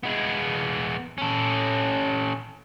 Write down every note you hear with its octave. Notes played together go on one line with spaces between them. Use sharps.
G#3 B3
C#4 A4